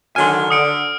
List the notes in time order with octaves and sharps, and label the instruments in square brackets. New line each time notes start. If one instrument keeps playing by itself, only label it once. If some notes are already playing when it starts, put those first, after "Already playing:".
[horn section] D3 D#3 F#3 [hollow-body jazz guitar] G#5 C6 [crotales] F6
[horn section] D3 [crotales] D#6 C#7 D7